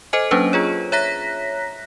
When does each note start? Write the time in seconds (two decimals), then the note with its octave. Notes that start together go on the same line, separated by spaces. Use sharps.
0.13 A4 C5 D#5 G#5
0.31 F#3 A#3 C#4 D4 B4 C5
0.53 F4 G#4 C#5
0.92 C#5 E5 A#5 F#6 A#6 B6